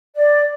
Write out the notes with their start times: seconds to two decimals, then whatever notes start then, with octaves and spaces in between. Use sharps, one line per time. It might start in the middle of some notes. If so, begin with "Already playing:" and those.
0.16 D5